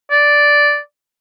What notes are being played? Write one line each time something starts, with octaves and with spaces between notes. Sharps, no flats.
D5